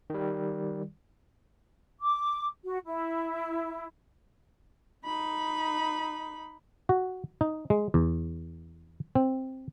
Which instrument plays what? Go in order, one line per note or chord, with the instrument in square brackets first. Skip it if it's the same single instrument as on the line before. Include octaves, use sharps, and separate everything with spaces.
[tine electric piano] D#3 G3
[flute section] D6
F#4
E4
[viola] D#4 B5
[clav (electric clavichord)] F#4
D#4
G#3
E2
C4